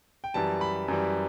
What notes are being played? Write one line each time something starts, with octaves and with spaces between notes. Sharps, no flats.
G5
F#2 E3 G3 A5
B5
F#2 E3 G3